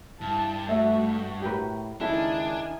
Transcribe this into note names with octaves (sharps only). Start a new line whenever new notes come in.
G2 E4 A5
A3 F#4 E5
A2 G4 A#4 B4
C#2 D#3 D4 E4 A4 G#5